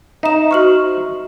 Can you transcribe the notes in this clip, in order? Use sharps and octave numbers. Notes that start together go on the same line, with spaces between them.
D#4 E5 E7
F#4 C5 C#6 F6 F#7